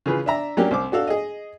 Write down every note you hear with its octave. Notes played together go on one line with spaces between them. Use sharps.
C#3 E3 F4 G#4 B4
D4 E5 A#5
F#3 A#3 C#4 D4 G4
C2 C5 D6
D4 F#4 A4 F5
G#4 D#5